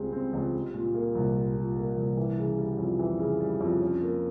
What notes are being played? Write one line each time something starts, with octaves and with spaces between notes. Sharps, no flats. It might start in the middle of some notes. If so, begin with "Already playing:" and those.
Already playing: C#2 C#3 G3 C4
C4
C#2
G3
A#2
A#3
C2
G3
A#2
A#3
C2
E3
C#3
G3
F2
E3
C#3
G3
F2
C#4
A#3